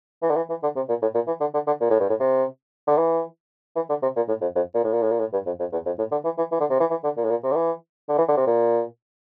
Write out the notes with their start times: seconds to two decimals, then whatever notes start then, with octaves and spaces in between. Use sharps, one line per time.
0.23 E3
0.30 D3
0.36 E3
0.50 E3
0.63 D3
0.76 C3
0.89 A#2
1.02 A2
1.15 A#2
1.28 E3
1.40 D3
1.54 D3
1.67 D3
1.81 A#2
1.90 A2
2.00 G2
2.09 A2
2.20 C3
2.87 D3
2.98 E3
3.76 E3
3.90 D3
4.03 C3
4.16 A#2
4.28 A2
4.41 F2
4.56 F2
4.75 A#2
4.84 A2
4.93 A#2
5.02 A2
5.11 A#2
5.19 A2
5.33 G2
5.46 F2
5.60 F2
5.72 E2
5.86 F2
5.99 A2
6.12 D3
6.25 E3
6.38 E3
6.52 E3
6.60 D3
6.70 C3
6.80 E3
6.91 E3
7.04 D3
7.17 A#2
7.24 A2
7.30 A#2
7.43 C3
7.52 D3
7.56 E3
8.09 D3
8.18 E3
8.28 D3
8.37 C3
8.47 A#2